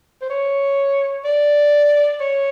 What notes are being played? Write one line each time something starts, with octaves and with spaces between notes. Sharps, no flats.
C5
C#5
D5
C#5